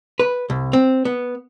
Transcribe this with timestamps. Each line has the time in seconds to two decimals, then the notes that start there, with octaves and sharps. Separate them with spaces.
0.19 B4
0.50 C2
0.73 C4
1.05 B3